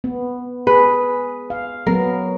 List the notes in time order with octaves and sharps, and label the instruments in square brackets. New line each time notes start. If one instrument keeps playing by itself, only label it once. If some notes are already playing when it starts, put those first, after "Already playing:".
[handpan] B3
[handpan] G#4 [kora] B4
[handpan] F5
[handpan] F#3 B3 [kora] A#4